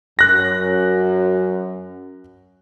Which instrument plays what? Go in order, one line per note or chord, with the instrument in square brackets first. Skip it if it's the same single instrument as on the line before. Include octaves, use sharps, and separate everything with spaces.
[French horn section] F#2 [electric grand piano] F#6 A#6